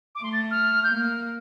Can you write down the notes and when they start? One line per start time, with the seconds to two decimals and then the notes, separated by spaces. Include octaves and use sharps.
0.15 D6
0.23 A3 C6
0.32 A6
0.50 F6
0.83 G6
0.95 A#3 F6